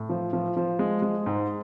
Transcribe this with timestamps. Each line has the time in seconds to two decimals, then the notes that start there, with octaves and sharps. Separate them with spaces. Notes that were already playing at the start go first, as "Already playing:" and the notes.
Already playing: A2
0.09 F3
0.33 F3
0.57 F3
0.79 G#3
1.02 G#3
1.26 G#2